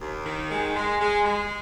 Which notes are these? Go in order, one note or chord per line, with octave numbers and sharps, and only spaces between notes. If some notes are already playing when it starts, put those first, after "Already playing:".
D#2
D#3
G#3
G#3
G#3
G#3